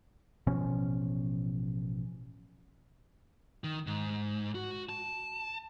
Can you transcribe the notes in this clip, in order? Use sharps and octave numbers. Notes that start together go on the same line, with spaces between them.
A1 B2 F3 C#4
D#3
G#2
F#4
A5